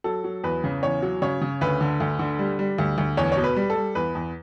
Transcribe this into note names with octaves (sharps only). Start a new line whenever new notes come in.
F#3 A4
F#3
E2 B4
C#3
E2 C#5
F#3
C#3 C#5
C#3
D2 B4
D3
D2
D3
G3
G3
D2
D2
E2 C#5
B2 C#5
B4
G3
A4
G3
E2 B4
E2